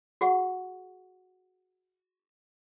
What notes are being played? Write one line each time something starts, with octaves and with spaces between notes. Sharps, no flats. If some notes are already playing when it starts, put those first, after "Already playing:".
F#4 G#4 F#5 C#6